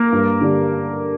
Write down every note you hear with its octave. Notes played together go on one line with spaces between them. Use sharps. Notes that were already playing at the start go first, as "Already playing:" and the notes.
Already playing: A#3 A#4
G2
D3 G3 D4